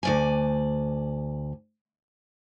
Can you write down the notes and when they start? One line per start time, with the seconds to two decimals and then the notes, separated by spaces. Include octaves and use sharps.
0.03 D2 D5 G#5